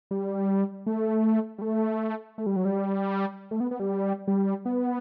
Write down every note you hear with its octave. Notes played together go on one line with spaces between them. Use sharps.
G3
A3
G3
A3
A3
G3
F#3
G3
A3
B3
B3
G3
G3
B3